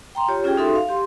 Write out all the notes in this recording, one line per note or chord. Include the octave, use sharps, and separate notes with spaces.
G5 A#5 C6
F4 G4 C#5
C#4 F4 G4 G#4 G5
D#4 F#4 A4 E5 C6
F5
G4 C6